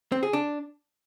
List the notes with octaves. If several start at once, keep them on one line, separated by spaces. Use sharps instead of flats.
C4
G#4
D4